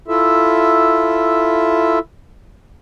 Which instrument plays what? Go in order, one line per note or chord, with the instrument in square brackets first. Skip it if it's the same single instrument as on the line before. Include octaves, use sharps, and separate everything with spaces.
[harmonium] E4 F4 A4 E5